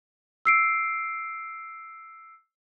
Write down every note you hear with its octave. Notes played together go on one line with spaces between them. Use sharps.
E6 C7 D7